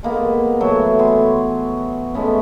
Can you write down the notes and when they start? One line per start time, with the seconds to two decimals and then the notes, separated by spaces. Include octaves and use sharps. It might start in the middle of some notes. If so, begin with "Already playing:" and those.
0.03 G#3 A#3 B3
0.60 E3 F#3 A3 C#5
0.99 B3 G#5 C6
2.14 G#3 A3 B3 C#4